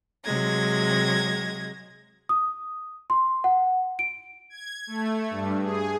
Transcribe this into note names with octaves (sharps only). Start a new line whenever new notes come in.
C3 F#3 G#3 G#6 A#6
D#6
C6
F#5
D7
G#6
A3
G2
G#4